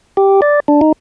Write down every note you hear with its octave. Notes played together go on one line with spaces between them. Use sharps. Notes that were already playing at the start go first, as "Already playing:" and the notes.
G4
D5
D4
D#4